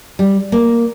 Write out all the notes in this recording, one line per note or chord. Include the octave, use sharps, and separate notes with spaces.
G3
A#3